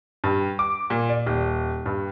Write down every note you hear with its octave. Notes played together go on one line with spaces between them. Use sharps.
G2
D6
A#2
D5
D#1
G2